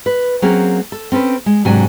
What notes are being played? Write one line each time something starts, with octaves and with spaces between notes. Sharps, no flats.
B4
F#3 A#3 C4 C#4 G#4
A4
C4 C#4 A4 B4
G#3
G#2 C3 F#3 D4 G#5